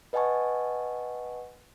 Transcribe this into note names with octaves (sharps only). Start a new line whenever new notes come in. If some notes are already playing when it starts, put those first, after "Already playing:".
B4 D#5 F#5 G#5 A5 C#6